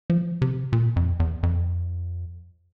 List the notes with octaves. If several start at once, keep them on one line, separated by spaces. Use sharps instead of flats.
F3
C3
A#2
F2
E2
F2